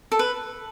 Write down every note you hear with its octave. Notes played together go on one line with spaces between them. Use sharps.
A4
B4